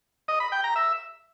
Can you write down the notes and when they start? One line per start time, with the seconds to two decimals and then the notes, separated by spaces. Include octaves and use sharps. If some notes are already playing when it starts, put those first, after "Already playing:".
0.28 D#5
0.40 B5
0.52 G5
0.64 A#5
0.76 E5